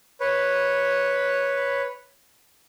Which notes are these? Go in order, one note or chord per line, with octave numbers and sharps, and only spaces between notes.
B4 C#5